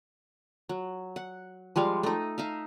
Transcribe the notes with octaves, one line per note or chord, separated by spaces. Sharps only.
F#3
F#5
F3 G3 G#3 F5
A3 D#4
D#4 E5 F5